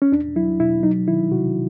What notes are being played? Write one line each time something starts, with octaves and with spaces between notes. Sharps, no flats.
C#4
E2 D4
F#3 E4
B2 E4
F#3 D#4
D#3 E4
C3 F#4